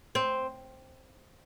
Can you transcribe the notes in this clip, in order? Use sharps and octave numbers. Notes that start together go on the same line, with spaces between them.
C4